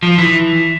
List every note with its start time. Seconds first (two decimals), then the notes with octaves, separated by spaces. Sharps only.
0.03 F3
0.18 E3